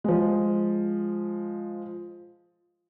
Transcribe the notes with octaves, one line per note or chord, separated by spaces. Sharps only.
F3 G#3